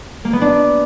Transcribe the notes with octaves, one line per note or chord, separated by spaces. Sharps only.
A#3
B3
D4